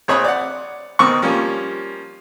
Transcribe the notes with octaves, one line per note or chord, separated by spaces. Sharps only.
A#1 C4 C#5 B5 D#6
D5 F#5
B2 D#3 C4 C#6
F3 G3 A#3 C#4